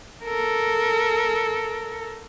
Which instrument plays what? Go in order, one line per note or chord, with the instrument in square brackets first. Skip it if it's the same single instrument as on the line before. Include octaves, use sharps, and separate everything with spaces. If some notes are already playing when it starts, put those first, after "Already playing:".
[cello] A4 A#4